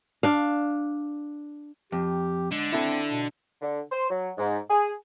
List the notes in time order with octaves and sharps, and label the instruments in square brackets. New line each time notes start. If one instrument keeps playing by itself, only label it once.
[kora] D4 F5
[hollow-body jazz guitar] F2 [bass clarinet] G4
[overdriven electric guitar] D3 [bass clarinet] G#3
[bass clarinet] C4 [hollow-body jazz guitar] E4 A4
[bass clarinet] B2
[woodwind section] D3
C5
F#3
G#2
G#4